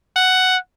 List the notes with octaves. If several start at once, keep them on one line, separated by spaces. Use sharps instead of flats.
F#5